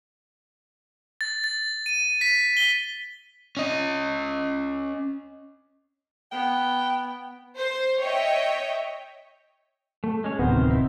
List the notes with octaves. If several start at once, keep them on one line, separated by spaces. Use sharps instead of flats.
A6
A6
D#7
B6
G7
C#4 D#5
B3 G5
C5
C#5 D#5 E5 G5
A3
G#3 C#4 C#5
D1 C3 D#3 B3 A#4 C5
C4 D#4 E4